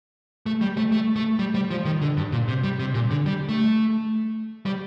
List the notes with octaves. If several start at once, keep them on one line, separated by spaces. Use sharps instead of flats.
A3
G3
A3
A3
A3
G3
G3
F3
D#3
D3
G2
A#2
C3
G3
C3
A#2
D3
G3
A3
G3